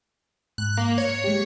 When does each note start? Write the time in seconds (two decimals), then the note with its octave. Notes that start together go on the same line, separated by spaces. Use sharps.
0.58 G#2 F#6
0.77 A#3
0.98 C#5
1.24 G#3 G4